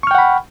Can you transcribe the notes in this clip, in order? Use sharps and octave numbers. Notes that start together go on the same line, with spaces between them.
F#5 G5 B5 C#6 F6